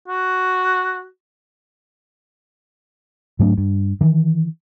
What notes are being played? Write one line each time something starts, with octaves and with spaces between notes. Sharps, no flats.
F#4
G#2 F#3 A3 D4
G2
D#3 E3